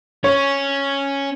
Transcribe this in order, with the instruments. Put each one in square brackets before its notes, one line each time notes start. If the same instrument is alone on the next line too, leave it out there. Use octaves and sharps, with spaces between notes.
[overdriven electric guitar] C#4 [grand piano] C#5